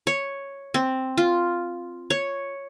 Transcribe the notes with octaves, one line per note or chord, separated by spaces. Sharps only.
C#5
C4
F4
C#5